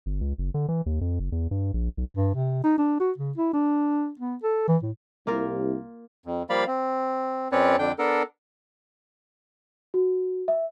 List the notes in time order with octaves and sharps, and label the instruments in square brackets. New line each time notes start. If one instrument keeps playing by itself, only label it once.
[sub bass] G1
C#2
F#1
D3
E3
D#2
F2
F#1
E2
G2
A#1
B1
[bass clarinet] G2
C3
D#4
D4
F#4
C#3
E4
D4
B3
A4
E3
A2
[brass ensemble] C2 [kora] A#3 F4 A#4
[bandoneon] F2
F3 G3 A#3 D5 F5 B5
C4
F2 C4 C#4 B4 C#5 D5
F2 D3 D4 G5
B3 D4 A4 A#4
[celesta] F#4
E5